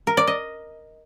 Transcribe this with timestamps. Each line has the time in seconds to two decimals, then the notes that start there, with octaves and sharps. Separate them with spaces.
0.07 A#4
0.17 D5
0.27 D#5